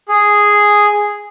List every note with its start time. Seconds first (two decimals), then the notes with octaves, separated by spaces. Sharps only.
0.08 G#4